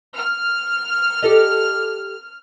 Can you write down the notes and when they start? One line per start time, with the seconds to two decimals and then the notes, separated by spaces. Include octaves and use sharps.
0.16 F6
1.22 G4 A4 D#5